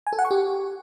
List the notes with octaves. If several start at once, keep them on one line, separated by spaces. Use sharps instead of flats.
G#5
A4
F#5
C#6
G4